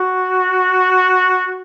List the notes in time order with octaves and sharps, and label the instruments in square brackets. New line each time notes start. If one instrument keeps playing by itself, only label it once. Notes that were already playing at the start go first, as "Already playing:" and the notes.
Already playing: [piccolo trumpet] F#4